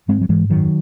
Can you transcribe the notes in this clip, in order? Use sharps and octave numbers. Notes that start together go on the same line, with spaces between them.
G#2 G#3 C4
F#3
G#2 E3 G#3
F#2 D#3 F#3